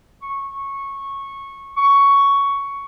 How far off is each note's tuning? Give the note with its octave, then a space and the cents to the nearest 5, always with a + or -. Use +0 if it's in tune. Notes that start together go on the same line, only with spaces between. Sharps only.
C#6 -15
C#6 +10